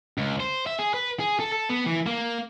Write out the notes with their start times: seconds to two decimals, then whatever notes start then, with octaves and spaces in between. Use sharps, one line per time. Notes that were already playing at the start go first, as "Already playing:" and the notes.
0.18 C#2
0.40 C5
0.67 E5
0.79 G#4
0.94 B4
1.20 G#4
1.40 A4
1.52 A4
1.69 B3
1.86 E3
2.06 A#3